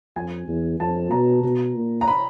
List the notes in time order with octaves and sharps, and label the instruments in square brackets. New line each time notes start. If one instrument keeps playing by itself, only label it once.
[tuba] F2 [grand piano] G#5
[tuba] E2
[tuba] F2 [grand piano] A5
[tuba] B2 [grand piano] A#5
[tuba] B2
A#2
[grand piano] A#5
B5